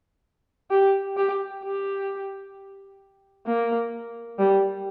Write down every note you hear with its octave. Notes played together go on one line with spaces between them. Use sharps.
G4
G4
G4
A#3
G3